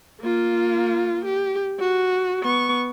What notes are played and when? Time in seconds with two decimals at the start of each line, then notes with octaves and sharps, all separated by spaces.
0.22 A#3 F4
1.25 G4
1.80 F#4
2.43 B3 C#6